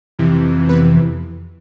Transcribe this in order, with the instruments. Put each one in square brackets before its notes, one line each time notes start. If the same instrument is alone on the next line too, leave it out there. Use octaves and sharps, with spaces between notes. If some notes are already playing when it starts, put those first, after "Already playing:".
[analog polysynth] F2 C3 E3
B3 B4